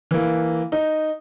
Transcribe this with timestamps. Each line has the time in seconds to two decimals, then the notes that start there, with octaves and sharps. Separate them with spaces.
0.11 E3 A#3
0.72 D#4